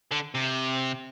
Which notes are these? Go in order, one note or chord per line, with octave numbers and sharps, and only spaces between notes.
D3
C3